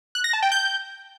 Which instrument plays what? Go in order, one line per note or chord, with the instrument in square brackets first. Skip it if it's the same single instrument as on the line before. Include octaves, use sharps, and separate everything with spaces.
[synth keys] F#6
A#6
A5
G5
G6